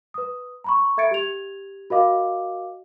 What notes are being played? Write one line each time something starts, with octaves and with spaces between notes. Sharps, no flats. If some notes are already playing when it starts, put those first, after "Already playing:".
B4 D#6
A#5 B5 C#6
A4 E5 G#6 A6 C#7 D7
G4 G#6 F7
F#4 A#4 D#5 F5 D6